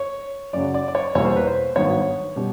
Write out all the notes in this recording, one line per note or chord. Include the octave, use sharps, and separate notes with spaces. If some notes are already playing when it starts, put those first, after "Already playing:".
Already playing: C#5
F#2 C#3 F#3 D5
D5
D5
C#5
E2 B2 G3 A#3 C#5
C5
B4
C5
G#1 G2 D#3 F#3 B3 C#5
B2 G3 B3